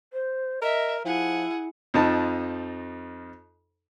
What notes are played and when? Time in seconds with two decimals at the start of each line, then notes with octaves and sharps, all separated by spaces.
0.13 C5
0.62 A#4 D#5 E5
1.05 F3 E4 G#4 F#5
1.94 F2 F3 D#4 A5